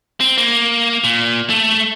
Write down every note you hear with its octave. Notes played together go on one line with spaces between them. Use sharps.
C4
A#3
A#2
A3